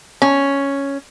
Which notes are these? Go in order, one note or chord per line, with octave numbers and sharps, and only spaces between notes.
C#4